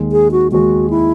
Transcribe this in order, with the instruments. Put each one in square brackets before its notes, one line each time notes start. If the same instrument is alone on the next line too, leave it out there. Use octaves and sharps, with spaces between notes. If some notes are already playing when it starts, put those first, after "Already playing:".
Already playing: [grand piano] D#2 D#3 G#3
[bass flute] G#4
F#4
[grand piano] D#2 D#3 G#3 [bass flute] F#4
[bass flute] E4